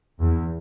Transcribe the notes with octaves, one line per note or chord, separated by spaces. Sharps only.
E2